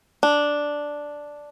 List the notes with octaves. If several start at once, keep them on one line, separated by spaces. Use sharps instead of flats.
D4